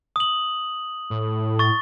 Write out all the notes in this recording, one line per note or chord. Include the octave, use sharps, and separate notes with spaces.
D#6 F#7
A2
C#6 A6